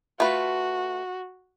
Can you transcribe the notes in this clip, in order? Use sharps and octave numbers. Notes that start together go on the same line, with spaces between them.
A3 F4 F#4 B4